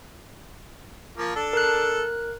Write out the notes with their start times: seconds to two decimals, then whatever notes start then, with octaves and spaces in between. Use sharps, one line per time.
1.17 F3 A#3
1.36 D4 A4
1.53 A#4 F#6